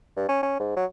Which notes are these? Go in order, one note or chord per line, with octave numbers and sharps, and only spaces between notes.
G2
C#4
C#4
G#2
F#3